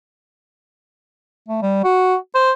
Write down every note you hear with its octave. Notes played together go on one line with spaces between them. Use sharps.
A3
G3
F#4
C5